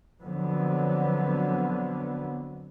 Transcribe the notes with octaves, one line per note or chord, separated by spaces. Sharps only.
F2 D3 F#3 B3